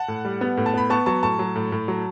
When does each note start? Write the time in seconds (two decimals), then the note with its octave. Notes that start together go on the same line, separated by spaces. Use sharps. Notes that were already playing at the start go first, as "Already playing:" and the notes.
Already playing: F#5 A5
0.08 A2
0.25 G3
0.41 B3
0.57 A2
0.66 A5
0.74 B3 B5
0.90 B3 A5 C#6
1.06 F#3 A5 C#6
1.23 A2 A5 C#6
1.39 F#3
1.56 A2
1.72 A2
1.88 F#3